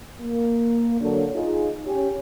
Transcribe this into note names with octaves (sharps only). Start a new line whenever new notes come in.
A#3
D3 F#3 A#3 D4 A4 C#5
D#4 F4 G#4
C#4 G4